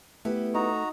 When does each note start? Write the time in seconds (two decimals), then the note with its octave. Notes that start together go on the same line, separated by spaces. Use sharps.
0.25 A3 B3 E4 G4
0.54 D#4 F#4 A#5